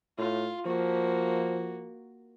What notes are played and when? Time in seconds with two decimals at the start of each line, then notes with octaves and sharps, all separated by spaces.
0.18 A2 F4
0.66 F3 A#3 F#4